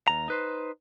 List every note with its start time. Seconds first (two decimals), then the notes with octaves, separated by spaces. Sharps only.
0.08 D#2 A#5
0.28 D#4 B4 C5